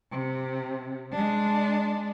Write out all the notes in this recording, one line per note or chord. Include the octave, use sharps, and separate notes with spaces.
C3
G#3 D4